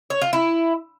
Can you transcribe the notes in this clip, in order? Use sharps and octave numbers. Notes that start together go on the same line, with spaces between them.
C#5
F4
E4